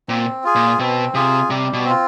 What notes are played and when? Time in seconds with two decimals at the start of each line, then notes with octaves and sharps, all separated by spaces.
0.09 A#2 C4
0.44 F4 G#4
0.55 A#2
0.79 B2 C4
1.14 C3 F4 G#4
1.49 C3 G3
1.73 B2
1.84 C4 F4